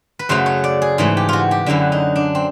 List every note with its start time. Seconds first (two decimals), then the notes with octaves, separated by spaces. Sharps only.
0.19 B4
0.29 F#2 C#3 F#3 A3 C5
0.46 C#5
0.64 D5
0.82 G#4
0.98 G#2 E3 A3
1.17 G4
1.29 F4 F#4
1.51 G4
1.66 F#2 D3 F#3 E4
1.92 D#4
2.16 D4
2.35 C4